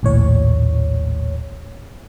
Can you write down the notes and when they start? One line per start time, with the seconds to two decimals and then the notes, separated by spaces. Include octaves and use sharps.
0.03 A#1 D#2 A2 C#5